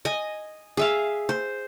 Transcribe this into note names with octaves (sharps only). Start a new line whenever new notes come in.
D#5 G#5
G#4 E5 F5
C5